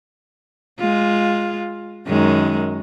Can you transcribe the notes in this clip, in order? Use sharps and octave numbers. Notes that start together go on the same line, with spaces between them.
G#3 F4
F#2 D#3 G#3